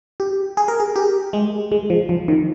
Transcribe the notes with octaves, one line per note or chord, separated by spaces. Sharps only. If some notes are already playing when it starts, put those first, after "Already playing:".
G4
G#4
A#4
G#4
G4
G#3
G#3
F3
F3
D#3